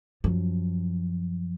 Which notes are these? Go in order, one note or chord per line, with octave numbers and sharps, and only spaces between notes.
F#2 F3